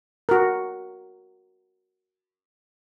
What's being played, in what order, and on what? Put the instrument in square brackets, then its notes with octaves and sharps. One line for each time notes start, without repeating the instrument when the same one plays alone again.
[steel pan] F#4 A#4